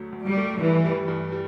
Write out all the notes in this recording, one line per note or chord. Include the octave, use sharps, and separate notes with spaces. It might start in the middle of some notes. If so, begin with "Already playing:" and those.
Already playing: D2 F#3 A3
D2
G3
A3
G2 E3
G3
G2
G3